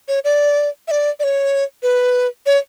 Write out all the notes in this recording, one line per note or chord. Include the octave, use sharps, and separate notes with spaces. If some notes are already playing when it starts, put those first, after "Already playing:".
C#5
D5
E5
D5
D5
C#5
B4
C#5